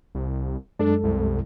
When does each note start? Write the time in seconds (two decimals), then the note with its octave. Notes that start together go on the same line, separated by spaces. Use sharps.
0.15 C2
0.79 F#2 G#3 D4 A4
1.04 C2